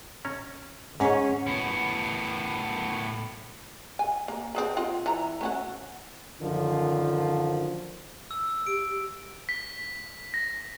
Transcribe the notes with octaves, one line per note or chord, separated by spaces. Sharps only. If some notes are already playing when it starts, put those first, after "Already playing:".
C#4 A#5
G#2 C#4 G#4 F#5
A2 B3
G#5
A#3
C4 G#4 B4
C4 F4 D#5
E3 A#5
A3 C#4 F#4
F#2 D3 D#3 F3
E6
G4 D7
B6
A#6